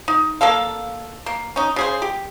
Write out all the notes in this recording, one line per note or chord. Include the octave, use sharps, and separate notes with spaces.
D#4
A#3 D4 A4 F5
A#3
C#4 D#4
C#3 G#4 C5
G4